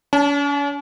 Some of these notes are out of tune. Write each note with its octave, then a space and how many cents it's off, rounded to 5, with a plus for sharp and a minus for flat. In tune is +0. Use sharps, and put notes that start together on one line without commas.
C#4 +45 A5 +0